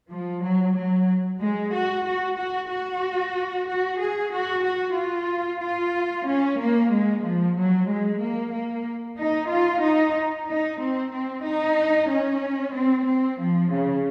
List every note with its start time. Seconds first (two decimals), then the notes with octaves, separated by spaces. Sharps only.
0.10 F3
0.42 F#3
0.75 F#3
1.39 G#3
1.72 F#4
2.04 F#4
2.37 F#4
2.69 F#4
3.66 F#4
3.99 G#4
4.31 F#4
4.63 F#4
4.95 F4
5.60 F4
6.25 C#4
6.58 A#3
6.91 G#3
7.22 F3
7.56 F#3
7.87 G#3
8.20 A#3
8.52 A#3
9.17 D#4
9.49 F4
9.81 D#4
10.47 D#4
10.78 C4
11.11 C4
11.43 D#4
12.08 C#4
12.72 C4
13.05 C4
13.38 F3
13.70 C#3